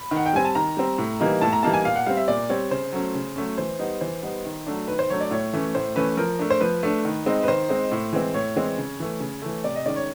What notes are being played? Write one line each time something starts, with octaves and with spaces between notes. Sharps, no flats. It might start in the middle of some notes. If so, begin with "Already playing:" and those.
Already playing: B5
D#3
F#5
G5
G3 C4 G#5
A5
D#3 A#5
G3 C4
A2
E3 G3 A#3 D#4
A2 A5
A#5
E3 G3 A#3 D#4 A5
G#5
A#2 F5
F#5
G3 C4 F5
E5
A#2 D5
G3 C4 C#5
C#3 C5
F#3 A3 C#4
C#3
F#3 A3 C#4
E3 C5
G3 B3 D#4
E3 C5
G3 B3 D#4
D#3
F#3 A3 D4
D#3 B4
C5
F#3 A3 D4 C#5
D5
A2 C#5
E3 A3 C#4
A2 C5
E3 A3 C#4 B4
F3 A#4
A3 D4
C5
F3 B4
A3 D4
D#3
G#3 C4 D#4
B4
D#3 C5
G#3 C4 D#4
A2
E3 G#3 C4
A2 C#5
E3 G#3 C4
C#3
E3 A3
C#3
E3 A3
C3 D5
D#5
D#3 G#3 C#4 D5
C#5